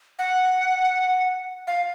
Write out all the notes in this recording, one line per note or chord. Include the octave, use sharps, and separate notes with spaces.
F#5
F5